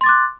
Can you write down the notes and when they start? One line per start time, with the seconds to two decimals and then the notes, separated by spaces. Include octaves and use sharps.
0.01 C6
0.04 A6
0.06 D6
0.09 F#6